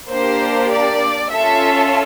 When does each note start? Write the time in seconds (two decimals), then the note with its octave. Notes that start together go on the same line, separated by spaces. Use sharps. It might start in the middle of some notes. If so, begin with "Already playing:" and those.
0.11 A#3 D4 G4 C5
0.72 D5
1.32 C#4 F4 A4 E5